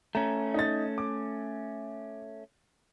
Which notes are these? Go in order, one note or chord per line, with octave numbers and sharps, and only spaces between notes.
A3 C#4 A#5
D#4 A6
D6